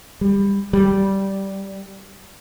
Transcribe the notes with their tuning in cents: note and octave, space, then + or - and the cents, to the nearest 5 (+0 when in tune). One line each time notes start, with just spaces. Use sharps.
G3 +20
G3 -10